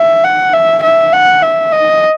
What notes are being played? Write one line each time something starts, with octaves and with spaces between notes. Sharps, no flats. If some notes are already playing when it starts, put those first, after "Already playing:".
Already playing: E5
F#5
E5
E5
F#5
E5
D#5